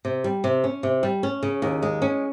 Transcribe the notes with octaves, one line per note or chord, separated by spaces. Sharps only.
C3
G3
C3
C#4
C3
G3
C#4
C#3
D#2
G#3
C#4